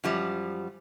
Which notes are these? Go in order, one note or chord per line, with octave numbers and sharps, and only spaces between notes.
F#2 F3 G3